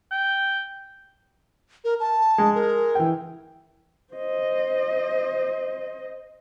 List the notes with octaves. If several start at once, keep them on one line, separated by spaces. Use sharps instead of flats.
G5
A#4
A5
G#3
A#4
E3 G5
C5 D#5